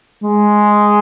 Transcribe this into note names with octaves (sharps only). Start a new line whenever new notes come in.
G#3